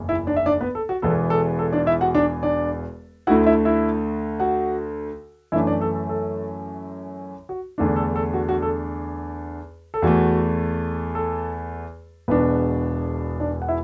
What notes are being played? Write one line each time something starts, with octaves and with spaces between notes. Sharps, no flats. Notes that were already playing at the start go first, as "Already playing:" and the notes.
Already playing: F#1 E2
E4 E5
D4 D5
E5
D4 D5
B3 B4
A4
F#4
E1 E2 E3 B3 A4
A4
A4
D4 D5
E4 E5
F#4 F#5
D4 D5
D4 D5
D2 D3 A3 E4 F#4 F#5
E4 E5
E4 E5
F#4 F#5
F#2 E3 A3 D4 E4 E5
D4 D5
A4
A4
A4
F#4
E2 D3 A3 D4
A4
A4
F#4
F#4
A4
A4
E2 E3 A3 F#4
A4
E1 E2 B2 B3 D4 B4
D4 D5
F#5
E4 E5